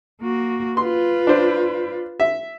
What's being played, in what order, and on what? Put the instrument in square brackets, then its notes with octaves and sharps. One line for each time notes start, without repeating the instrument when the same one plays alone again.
[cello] A#3 F#4
[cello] F4 B4 [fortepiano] C6
[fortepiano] D4 C5
E5